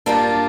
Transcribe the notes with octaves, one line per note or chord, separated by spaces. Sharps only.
G2 G3 A#3 D4 F4